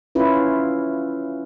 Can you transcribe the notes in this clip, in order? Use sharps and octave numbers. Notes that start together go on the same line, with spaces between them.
C#4 E4 F4 B4